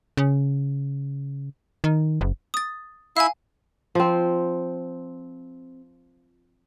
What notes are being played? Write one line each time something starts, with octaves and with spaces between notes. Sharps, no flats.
C#3
D#3
F#1
D#6 A6
E4 E5 F5 G#5
F3 C4